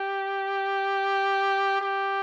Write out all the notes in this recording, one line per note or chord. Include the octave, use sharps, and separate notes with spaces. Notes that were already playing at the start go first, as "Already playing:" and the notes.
Already playing: G4
G4